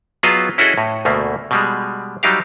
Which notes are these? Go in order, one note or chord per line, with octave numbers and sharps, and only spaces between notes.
F#3 B3 F4 G#4 D#5 A5
C#4 E4 F#4 G#4 A4 D#5
A2
D2 B2 A3 A#3
B2 G3 G#3
F#3 G3 D#4 G4 F5